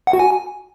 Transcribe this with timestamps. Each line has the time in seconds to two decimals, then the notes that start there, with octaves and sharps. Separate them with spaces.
0.07 F#5
0.13 F#4
0.19 G#5